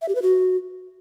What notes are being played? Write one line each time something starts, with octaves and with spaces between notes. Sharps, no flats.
E5
G4
B4
F#4